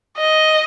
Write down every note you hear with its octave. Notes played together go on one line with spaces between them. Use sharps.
D#5